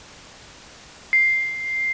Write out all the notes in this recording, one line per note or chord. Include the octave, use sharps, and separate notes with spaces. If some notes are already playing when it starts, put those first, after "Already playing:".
C7